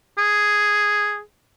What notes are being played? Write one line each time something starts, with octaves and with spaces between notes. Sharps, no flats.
G#4